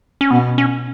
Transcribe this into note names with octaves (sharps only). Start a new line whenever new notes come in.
C#4
B2 B3
C#4